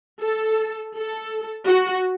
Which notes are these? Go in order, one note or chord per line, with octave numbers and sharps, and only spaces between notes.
A4
A4
F#4